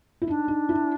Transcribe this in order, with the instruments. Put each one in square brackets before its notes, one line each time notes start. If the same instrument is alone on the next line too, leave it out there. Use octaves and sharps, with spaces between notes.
[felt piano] E4
[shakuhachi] D4 [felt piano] D#4
[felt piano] D#4
E4